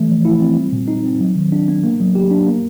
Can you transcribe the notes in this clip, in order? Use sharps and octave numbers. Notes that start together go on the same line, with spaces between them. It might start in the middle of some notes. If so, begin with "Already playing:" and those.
Already playing: E3 A3
F3
E4
C4
G3
A#2
D#4
C4
F#3
D#3
D4
B3
A#3
F#3
G4
D4
A#3